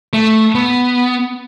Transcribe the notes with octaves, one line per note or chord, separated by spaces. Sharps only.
A3
B3